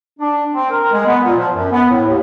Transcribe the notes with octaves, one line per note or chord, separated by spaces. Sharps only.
D4
C4
A#4
G#3
B3
A#2
F3
F#2
B3
A2
D#2